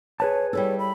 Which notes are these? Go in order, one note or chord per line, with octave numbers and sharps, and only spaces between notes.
G#4 B4 C#5 A5
G3 E4 A4 C#5
B5